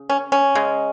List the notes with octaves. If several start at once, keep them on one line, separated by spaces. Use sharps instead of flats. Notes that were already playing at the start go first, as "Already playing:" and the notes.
Already playing: C#3
C#4
C#4
C#3 G#3